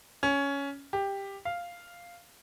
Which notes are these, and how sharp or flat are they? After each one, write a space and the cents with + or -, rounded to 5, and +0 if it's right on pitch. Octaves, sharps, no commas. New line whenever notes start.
C#4 +10
G4 +10
F5 -5